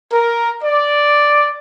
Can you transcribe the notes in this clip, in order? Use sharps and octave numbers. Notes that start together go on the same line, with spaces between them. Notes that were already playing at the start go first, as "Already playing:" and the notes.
A#4
D5